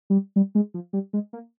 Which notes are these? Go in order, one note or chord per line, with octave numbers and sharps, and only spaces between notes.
G3
G3
G#3
F3
G3
G#3
A#3